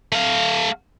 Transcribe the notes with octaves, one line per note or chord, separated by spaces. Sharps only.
A3 F5